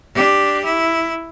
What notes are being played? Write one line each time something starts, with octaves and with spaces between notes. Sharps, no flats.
D4 G4
E4